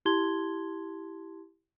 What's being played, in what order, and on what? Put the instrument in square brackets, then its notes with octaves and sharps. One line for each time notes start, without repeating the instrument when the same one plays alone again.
[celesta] E4 G4 A5 C6 G#6 G7